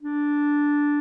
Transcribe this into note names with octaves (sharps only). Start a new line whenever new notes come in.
D4